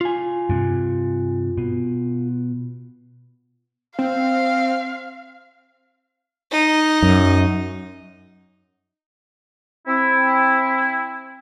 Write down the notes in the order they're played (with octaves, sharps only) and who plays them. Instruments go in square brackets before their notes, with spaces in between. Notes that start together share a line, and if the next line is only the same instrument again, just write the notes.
[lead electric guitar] F4 G#5
[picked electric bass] G2 C3
B2
[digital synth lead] C4 [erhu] F5
[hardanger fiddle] D#4
[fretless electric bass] F#2
[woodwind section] C4 E4